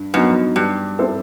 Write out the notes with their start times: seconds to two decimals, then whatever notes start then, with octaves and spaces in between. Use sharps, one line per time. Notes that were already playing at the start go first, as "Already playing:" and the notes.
Already playing: G2
0.14 F#2 F#3 B3 D#4
0.56 G2 G3
0.99 C4 E4 A4 C5